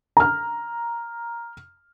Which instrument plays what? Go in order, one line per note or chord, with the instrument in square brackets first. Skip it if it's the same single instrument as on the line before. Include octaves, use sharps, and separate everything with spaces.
[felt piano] A#5 F6